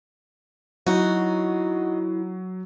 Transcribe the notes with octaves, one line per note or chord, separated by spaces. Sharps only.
F#3 D#4 E4 F#4